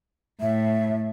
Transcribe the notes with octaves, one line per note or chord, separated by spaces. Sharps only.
A2 E5